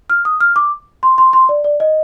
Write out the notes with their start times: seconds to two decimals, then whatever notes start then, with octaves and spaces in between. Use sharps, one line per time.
0.10 F6
0.25 D#6
0.41 F6
0.56 D6
1.03 C6
1.18 C6
1.33 C6
1.49 D5
1.64 D5
1.80 D#5